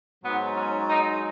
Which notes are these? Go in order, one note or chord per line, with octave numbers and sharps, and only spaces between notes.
G#2 F#3 B3
C#4
D#4